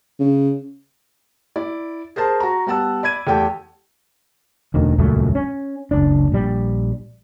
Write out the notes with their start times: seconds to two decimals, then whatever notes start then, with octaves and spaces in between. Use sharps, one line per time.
0.20 C#3
1.56 E4 D5
2.16 G#4 A#4 C5 A5
2.40 F#4 A#5
2.66 G3 B3 F#5 A5 E6
3.03 D5 B5 G#6 D#7
3.27 E2 A3 G4 G5 A5
4.74 E1 D2 D#3
4.98 D#1 C#2 F#2 A3
5.35 C#4
5.91 F#1 C#2 D4
6.32 A#1 G3